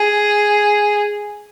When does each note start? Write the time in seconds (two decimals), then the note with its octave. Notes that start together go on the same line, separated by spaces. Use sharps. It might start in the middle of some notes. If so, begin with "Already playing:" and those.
Already playing: G#4